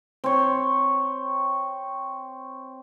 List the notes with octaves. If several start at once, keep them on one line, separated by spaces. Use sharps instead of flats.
C4 C#5